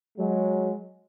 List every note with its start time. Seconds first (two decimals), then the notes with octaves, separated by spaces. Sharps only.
0.18 F#3 G#3